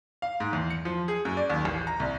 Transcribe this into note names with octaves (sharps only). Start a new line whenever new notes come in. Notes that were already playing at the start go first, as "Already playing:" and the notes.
F5
G#2
E2
C#7
F3
G#4
F#2
D5
D#2
A1
A#5
C2